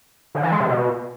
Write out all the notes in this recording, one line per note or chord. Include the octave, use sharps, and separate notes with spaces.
D3
E3
G#3
C3
B2